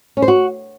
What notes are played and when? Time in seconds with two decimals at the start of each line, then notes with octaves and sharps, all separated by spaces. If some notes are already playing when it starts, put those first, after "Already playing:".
0.17 C#4
0.22 C5
0.28 F#4